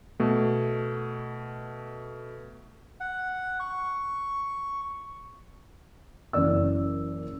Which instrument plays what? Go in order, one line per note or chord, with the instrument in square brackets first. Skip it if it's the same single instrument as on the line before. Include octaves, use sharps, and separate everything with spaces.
[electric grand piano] B2 A3
[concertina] F#5
C#6
[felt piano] F#1 F#2 E3 D5 E6